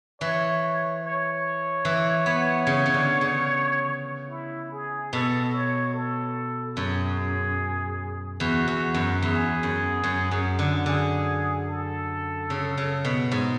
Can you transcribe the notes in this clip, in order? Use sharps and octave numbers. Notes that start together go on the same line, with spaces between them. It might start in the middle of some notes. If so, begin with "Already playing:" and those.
E3 C#5
C#5
E3
B3
C#3
C#3
D3
C#3
E4
G#4
B2 A4
C#5
A4
F#2 G#4
E2 F#4
E2
F#2
E2 G#4
F#2
F#2
F#2
D3
D3 G#4
A4
C#3
C#3
B2
G#2